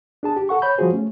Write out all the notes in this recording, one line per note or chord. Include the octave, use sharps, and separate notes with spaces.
D4 G#4 A5
G4
A4 F#5 C#6
C#5 B5 G6
F3 G3 F4 F#4 G#4 C5
A3 C#4